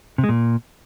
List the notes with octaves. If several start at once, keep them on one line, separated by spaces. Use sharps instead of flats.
C3
G#3
A#2